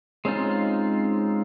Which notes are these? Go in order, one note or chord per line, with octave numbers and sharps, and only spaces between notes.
G#3 C4 C#4 D#4 F4